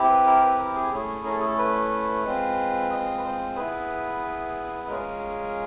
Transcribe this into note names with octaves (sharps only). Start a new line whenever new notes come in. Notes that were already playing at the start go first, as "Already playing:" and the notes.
Already playing: C4 E4 G4
B4
A#4
B4
A#4
G#4
A3 C#4 E4 G#4
A#4
A4
G#4
A4
B4
G#3 C4 F4
D#5
B4
C5
B3 E4 G#4 B4
G#3 C#4 F4 G#4 A#4